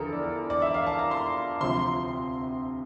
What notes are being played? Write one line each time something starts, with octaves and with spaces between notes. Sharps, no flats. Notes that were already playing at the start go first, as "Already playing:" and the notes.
Already playing: E2 D3 F3 A4 A#4
D5
D5
E5
F5
A5
A#5
C6
D2 C3 F3 C6